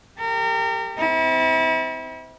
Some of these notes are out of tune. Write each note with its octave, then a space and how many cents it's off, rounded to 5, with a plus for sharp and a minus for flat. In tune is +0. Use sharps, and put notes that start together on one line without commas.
G4 +10 A#4 -35
C4 -20 E4 -35